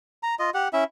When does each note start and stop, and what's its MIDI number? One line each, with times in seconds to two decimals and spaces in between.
0.23 0.35 82
0.39 0.50 65
0.39 0.50 75
0.54 0.68 67
0.54 0.68 78
0.73 0.84 61
0.73 0.84 64
0.73 0.84 76